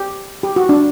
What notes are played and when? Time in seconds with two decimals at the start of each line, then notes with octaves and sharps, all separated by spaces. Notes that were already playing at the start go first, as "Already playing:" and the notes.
Already playing: G4
0.43 G4
0.56 F#4
0.69 D4